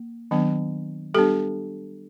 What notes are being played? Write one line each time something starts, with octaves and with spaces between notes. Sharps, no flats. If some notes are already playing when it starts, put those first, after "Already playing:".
Already playing: A#3
D#3 F#3 B3 D4
G3 B3 D4 G4 A4